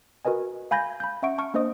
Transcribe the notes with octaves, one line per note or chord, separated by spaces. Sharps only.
F#4 A#4 B4 D#5 G#5
F5 G#5 B5 G6 G#6 A#6
B5 G6
C#4 E5 F#5 C#6 D7
A5 C#6 F6
A#3 D4 C5 D#5 D#6